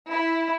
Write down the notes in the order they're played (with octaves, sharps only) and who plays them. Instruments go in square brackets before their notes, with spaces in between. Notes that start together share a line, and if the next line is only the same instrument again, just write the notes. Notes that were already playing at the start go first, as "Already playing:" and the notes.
[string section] E4